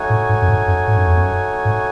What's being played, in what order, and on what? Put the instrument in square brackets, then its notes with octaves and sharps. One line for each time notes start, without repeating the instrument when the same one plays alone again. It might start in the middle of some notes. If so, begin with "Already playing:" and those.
Already playing: [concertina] A3 D#4 F#4 C#5 G#5
[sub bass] A2
G#2
F#2
G#2
F#2
G#2
F#2
E2
F#2
G#2